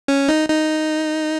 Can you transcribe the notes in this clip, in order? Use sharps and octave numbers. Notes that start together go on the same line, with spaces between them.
C#4
D#4
D#4